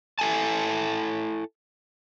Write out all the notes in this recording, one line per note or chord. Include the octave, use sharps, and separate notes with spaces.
E4 A4 G#5 A5